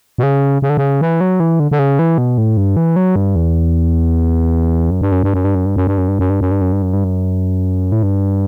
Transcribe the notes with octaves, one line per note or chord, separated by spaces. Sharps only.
B2
C#3
C#3
D3
C#3
E3
F#3
E3
D3
D3
C#3
E3
B2
A2
G2
E3
F#3
G2
E2
F#2
G2
F#2
G2
F#2
G2
F#2
G2
F#2
G2
F#2
G2
F#2
G2
F#2
G2
F#2
G2
F#2
G2
F#2
A2
G2